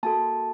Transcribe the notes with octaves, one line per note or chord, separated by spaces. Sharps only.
A#3 F#4 A4 A5